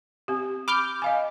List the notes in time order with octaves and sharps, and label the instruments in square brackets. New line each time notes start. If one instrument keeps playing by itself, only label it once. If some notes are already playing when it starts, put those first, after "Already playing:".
[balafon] C4 G4
[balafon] B5 [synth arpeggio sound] D6 F6 G6
[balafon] D#5 F5 G#5